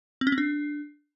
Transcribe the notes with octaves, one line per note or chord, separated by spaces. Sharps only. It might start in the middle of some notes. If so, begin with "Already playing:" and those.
C4
C#4
C4
D4